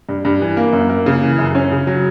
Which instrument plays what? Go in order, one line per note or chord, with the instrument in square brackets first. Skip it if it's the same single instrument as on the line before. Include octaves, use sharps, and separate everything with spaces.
[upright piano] G2
G2
E3
A#3
F#2
A#3
C#3
E3
F#2
C#4
C#3
F#3